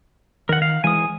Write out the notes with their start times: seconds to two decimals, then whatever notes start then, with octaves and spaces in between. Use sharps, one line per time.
0.49 D#3 A#4 F#5
0.62 F5
0.84 E3 G#3 G#5 D#6